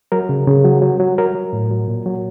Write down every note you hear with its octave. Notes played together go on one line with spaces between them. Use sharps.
F#3 A#4
C#3
C#3
F#3
F#3
F#3
F#3 A#4
F#3
A2
F#3
A#2
F#3